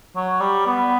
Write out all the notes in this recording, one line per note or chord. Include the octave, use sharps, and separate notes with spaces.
F#3
G3
B3